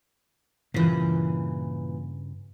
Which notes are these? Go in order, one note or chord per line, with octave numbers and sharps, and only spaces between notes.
G2 A#2 C#3 E3